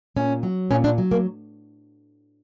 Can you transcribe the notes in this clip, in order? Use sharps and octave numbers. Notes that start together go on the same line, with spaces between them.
A#2 C#4
F#3
A#2 C#4
D4
F#3
A#3